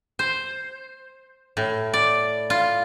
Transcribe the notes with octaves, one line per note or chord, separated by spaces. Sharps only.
C5
A2
D5
F4